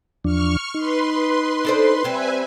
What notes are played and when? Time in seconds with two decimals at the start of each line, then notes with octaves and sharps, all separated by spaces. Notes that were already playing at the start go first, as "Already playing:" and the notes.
0.24 E2 F3 D4 C#6 F6
0.74 D#4 B4 C6
1.65 D4 A4 C5
2.04 G3 C4 B4 E5 G#5